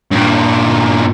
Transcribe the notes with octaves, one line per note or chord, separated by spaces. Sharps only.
G2 A#2